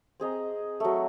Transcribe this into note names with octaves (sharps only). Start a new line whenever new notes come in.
C4 G#4 D#5 A#5
F#3 A3